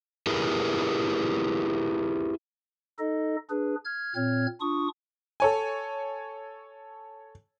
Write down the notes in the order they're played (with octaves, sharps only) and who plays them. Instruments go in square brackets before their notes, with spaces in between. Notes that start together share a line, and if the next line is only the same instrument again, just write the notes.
[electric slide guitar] E4 G4 G#4 A#4 B4
[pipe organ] D#4 A4 D#5
D4 G#4 B4
F6 G#6
A#2 C4 C#5 F6 G#6
D4 F4 C#6 D#6
[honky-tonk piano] A4 C#5 G#5